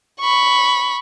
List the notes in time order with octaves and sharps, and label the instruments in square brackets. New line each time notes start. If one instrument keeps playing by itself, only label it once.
[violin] B5 C#6